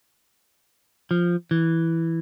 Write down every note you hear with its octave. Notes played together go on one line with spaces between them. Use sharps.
F3
E3